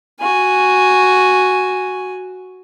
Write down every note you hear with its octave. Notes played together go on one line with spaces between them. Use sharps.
F#4 G#5